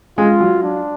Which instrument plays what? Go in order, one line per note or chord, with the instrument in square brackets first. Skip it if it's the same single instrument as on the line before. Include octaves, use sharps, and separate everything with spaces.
[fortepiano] G#3 [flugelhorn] F4
[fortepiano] F#3
[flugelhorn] D4